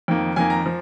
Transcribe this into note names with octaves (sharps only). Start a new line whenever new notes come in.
F2 D#3 A#3
F2 D#3 A#3 G#5
A#5
F3